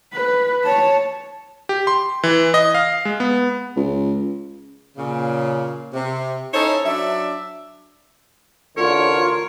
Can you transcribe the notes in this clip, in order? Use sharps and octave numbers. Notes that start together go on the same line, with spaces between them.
B4
C#5 A5
G4
C6
E3
D#5
F5
G#3
B3
C#2
A#2 C#3
C3
C#4 D#4 E4 A4 C5 C#5
F#3 D4 D5 E5
A1 D2 D3 F4 A#4 C#5